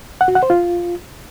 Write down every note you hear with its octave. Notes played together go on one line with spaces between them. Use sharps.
F#5
F#4
F#5
C5
F4